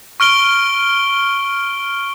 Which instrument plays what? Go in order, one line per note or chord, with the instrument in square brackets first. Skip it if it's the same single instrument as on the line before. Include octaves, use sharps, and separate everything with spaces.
[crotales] C#6 F6 D7 G7